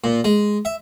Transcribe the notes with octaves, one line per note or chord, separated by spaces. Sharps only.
A#2
G#3
E5